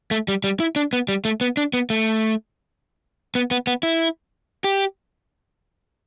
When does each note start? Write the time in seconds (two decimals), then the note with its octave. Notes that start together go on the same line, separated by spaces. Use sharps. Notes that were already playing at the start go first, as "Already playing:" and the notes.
0.11 A3
0.28 G3
0.44 G3
0.60 E4
0.76 D4
0.93 B3
1.08 G3
1.25 A3
1.41 B3
1.57 D4
1.73 B3
1.90 A3
3.35 B3
3.51 B3
3.67 B3
3.83 E4
4.64 G4